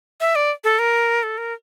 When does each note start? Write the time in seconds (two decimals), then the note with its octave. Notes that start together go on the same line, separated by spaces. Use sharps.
0.21 E5
0.36 D5
0.64 A4
0.79 A#4
1.23 A4
1.38 A#4